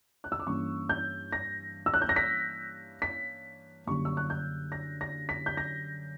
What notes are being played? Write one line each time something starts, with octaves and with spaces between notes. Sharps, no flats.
F#6
E6
D6
G2 E3 A#3 C#4 C#6
G6
A#6
E6
F#6
G6
A#6
B6
B6
F#2 D3 G3 A#3 C#6
E6
F#6
G6
A#6
A#6
B6
G6
A#6